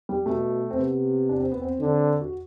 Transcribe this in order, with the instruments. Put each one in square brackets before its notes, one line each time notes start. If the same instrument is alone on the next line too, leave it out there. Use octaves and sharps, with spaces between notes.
[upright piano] G3
[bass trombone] B2 [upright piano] A3
[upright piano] C4
[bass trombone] C3 [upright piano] B3
[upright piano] D4
C4
B3
C4
[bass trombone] D3 [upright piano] C4
[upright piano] F#4